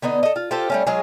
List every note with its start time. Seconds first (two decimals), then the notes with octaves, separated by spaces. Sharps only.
0.02 D3 B3 D#4 D#5
0.23 A4 D#5
0.36 F4
0.51 F4 G4 A4 C5
0.70 G3 A3 C#4
0.87 F#3 G#3 F4 G#4